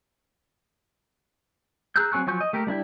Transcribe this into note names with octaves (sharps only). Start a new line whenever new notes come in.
G#4 A#5 E6 F#6 G6
F#3 C4 G#5 C#6 F#6
F3 F#3 G#5 C#6 G6
D#5
A3 G4 A#4
G3 D4 E4 G4